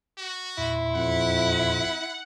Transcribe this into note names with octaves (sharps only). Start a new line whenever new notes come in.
F#4
E2 A#2 E4 C6
F2 F#5